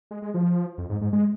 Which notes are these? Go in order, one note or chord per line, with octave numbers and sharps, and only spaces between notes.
G#3
G#3
F3
F2
G#2
G#2
G#3